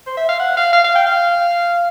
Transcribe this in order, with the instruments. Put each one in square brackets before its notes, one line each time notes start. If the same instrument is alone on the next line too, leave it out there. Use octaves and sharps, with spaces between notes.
[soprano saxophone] C5
E5
F5
F#5
F5
F5
F5
G5
F5